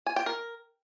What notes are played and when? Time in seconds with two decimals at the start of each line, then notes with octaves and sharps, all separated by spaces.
0.06 G#5
0.16 G5
0.26 A#4